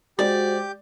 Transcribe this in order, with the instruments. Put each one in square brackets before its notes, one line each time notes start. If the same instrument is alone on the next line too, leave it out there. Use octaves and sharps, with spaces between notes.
[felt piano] G#3 [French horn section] F#4 C5 [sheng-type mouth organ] G4 D6 G6 [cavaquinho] D5